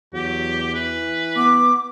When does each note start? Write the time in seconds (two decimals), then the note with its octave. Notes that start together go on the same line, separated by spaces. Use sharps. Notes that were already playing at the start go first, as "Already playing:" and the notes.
0.14 E2 F#3 G4
0.75 E3 B4
1.36 B3 D6